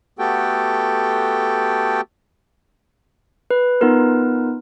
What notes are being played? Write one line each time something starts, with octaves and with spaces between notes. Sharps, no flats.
A3 B3 F#4 G4 A4 G5
B4
B3 D#4 F4 A#4 B4